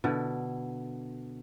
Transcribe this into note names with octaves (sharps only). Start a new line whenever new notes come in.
B2 D3 E4